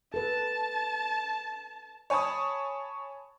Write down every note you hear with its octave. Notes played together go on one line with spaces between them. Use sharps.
A4 B4 A5
C#5 G#5 A5 B5 D#6